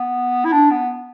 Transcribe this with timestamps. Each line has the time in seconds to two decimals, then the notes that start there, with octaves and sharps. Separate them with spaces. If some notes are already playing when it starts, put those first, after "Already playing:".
Already playing: B3
0.45 E4
0.52 D4
0.71 B3